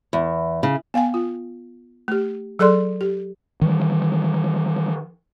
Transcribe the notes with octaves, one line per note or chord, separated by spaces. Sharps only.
E2
C#3
B3 F5 G5 G#5
F4
A3 G4
F#3 G#4 A4 D5 C6
G4
D#3 E3 G3